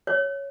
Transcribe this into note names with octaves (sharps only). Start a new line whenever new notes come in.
C#5